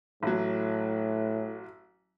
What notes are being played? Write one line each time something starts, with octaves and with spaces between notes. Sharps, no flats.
A1 A2 F#3